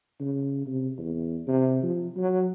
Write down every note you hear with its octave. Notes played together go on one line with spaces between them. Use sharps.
C#3
C3
E2
C3
F3
F#3